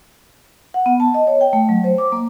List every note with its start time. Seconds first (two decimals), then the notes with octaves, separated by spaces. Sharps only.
0.74 F#5
0.86 B3
1.00 A5
1.14 D#5
1.27 C#5
1.41 G5
1.53 A3
1.69 F#3
1.84 C5
1.98 D6
2.12 A#3